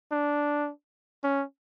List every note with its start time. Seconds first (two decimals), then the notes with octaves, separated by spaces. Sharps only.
0.11 D4
1.23 C#4